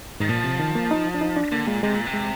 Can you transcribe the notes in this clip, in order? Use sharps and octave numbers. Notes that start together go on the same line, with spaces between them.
G#2 D#3
A#2 F3
C3
D#3
A#3
D#4
D4
D#4
D4
D3 A#3
A#2 G#3
C3 G#3
A#2
C3
G#3